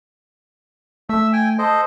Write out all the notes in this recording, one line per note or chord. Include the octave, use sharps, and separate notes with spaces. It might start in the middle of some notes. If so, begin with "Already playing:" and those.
A3 E5 E6
G5 G#5
A4 C5 D#5